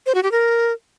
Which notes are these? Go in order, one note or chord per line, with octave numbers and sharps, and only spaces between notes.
C5
F#4
G4
A#4